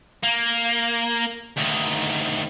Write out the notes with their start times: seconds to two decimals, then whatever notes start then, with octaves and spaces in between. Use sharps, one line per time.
0.24 A#3
1.57 D2 D#3